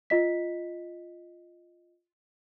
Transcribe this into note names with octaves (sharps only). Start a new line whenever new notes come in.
F4 D#5 B6